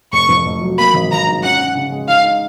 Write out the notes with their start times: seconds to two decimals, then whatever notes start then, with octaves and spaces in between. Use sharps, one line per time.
0.12 F1 C#6
0.29 F2
0.45 F1
0.61 F#3
0.78 A#3 B5
0.94 G#1
1.10 F3 A#5
1.27 G#2
1.43 C#4 F#5
1.59 C#4
1.75 C#3
1.92 G#3
2.08 D#4 F5
2.24 D#4